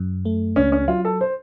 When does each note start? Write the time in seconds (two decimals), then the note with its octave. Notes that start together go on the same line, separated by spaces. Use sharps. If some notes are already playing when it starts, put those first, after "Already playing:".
Already playing: F#2
0.25 A3
0.56 C#2 C#4
0.72 C#4
0.88 F#3 F4
1.05 A4
1.21 C5